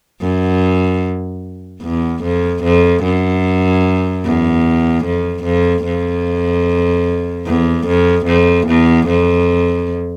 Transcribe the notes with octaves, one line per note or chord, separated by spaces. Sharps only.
F#2
E2
F2
F2
F#2
E2
F2
F2
F2
E2
F2
F2
E2
F2